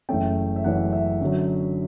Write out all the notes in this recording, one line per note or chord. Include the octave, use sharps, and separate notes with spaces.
F#1 F#2 E3 A3 C#4 G5
E5
F#1 F#2 E3 A3 C#4 F#5
E5
F#2 D3 F#3